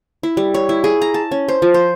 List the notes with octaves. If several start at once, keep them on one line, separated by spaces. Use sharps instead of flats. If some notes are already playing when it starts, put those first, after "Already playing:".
E4
G3
C#5
E4
G#4
A#5
A5
C#4
C5
F3
C5